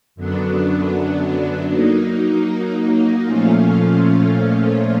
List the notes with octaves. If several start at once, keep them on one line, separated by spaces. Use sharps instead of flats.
F#2 D3 F#3 B3 D4
F#3 A#3 D#4
A#2 F3 A3 C#4 F4